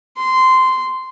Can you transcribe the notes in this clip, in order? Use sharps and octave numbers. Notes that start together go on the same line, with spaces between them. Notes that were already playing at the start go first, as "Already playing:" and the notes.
C6